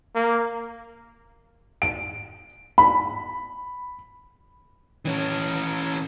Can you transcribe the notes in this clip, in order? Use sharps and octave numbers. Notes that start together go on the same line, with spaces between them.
A#3
D7
B5
E3 C#4